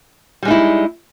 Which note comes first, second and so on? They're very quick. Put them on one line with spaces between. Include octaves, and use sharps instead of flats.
G3 G#3 D#4 E4